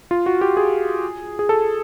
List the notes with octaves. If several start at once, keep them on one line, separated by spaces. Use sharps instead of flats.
F4
F#4
G4
G#4
G#4
A4